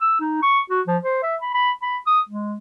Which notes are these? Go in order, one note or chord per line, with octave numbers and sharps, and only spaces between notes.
E6
D#4
C#6
F#4
F3
C5
E5
B5
B5
B5
D#6
G#3